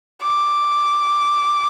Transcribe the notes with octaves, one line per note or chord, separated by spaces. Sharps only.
D6